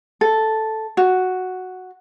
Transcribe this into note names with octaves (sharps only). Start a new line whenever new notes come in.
A4
F#4